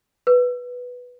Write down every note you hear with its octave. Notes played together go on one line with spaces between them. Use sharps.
B4